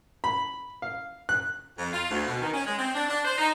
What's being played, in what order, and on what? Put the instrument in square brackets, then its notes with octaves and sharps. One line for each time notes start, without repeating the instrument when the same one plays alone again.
[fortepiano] B5
F5
F#6
[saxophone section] F2
F4
D2
B2
D#3
C#4
G#3
C4
D4
D4
C5
D#4